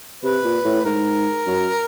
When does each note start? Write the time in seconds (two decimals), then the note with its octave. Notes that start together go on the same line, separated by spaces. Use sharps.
0.24 C3 B4
0.44 A#2
0.65 A2
0.85 G#2 A#4
1.46 F#2